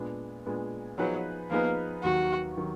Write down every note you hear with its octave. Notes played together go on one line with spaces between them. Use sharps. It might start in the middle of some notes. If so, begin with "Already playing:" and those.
Already playing: A#2 G#3 B3 D4
A#2 G#3 B3 D4
F3 F#3 B3 D#4 G#4 B4
F3 A#3 B3 D#4 G#4 B4
D#2 D#3 F#3 F#4
D#3 F#3